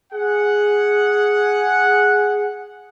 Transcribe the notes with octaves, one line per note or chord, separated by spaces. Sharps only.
G#4 F#5